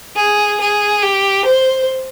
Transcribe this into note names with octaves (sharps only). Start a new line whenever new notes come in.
G#4
G#4
G4
C5